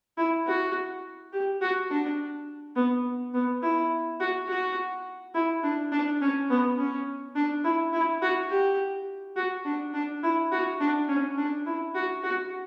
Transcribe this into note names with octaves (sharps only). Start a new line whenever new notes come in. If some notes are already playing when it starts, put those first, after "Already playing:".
E4
F#4
G4
F#4
D4
B3
B3
E4
F#4
F#4
E4
D4
D4
C#4
B3
C#4
D4
E4
E4
F#4
G4
F#4
D4
D4
E4
F#4
D4
C#4
D4
E4
F#4
F#4